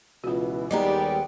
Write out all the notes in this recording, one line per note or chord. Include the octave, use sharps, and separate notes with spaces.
C#2 B2 E3 F4 F#4
D#2 G3 G#3 B3 G4 D5 D#5 A#5